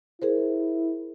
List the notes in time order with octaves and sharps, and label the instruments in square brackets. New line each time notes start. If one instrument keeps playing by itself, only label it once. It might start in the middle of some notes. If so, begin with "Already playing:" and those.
[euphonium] E4 [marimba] G#4 A#4 C5